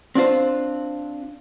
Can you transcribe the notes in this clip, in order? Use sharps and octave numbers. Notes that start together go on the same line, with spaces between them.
C4 D4 F4 C5